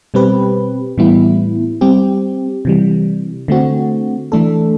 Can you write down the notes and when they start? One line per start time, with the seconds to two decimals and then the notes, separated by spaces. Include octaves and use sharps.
0.14 B2 G3 C4 G4 B4
0.98 A2 E3 G3 B3 E4
1.81 G3 C4 G4
2.65 C3 E3 G3
3.48 D3 A3 C4 F#4
4.32 E3 A3 D4 A4